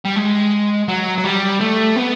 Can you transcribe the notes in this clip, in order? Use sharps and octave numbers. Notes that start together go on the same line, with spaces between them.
G3
G#3
F#3
F#3
G3
A3
B3